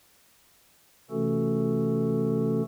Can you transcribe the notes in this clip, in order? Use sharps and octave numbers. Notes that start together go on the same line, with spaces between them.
C3 E3 A3 C#4 F#4 A4